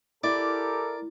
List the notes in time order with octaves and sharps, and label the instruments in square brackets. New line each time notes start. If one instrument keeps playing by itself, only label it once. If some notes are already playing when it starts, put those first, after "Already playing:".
[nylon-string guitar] E4 [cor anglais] G4 [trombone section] A4 A#4 [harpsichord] D5